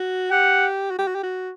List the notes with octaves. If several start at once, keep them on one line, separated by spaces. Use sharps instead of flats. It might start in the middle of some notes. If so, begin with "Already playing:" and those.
Already playing: F#4
G4 F#5
F#4
G4
F#4
G4
F#4